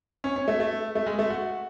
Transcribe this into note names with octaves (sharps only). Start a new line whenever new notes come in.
C#4
C#4
A3
A3
A3
G#3
A3
F#4